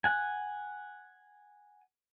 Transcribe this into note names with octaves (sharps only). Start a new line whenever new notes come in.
F#5 G#5